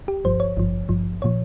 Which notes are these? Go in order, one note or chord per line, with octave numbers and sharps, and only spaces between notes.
G4
G1 G2 F3 C5
C#5
G#1 G2 F3
G#1 G2 F3
A#2 F3 C#5